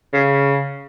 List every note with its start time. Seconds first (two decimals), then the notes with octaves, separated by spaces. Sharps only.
0.13 C#3